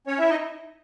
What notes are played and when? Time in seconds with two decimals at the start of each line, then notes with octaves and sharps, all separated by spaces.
0.07 C#4 C#5
0.18 E4 E5
0.29 D#4 D#5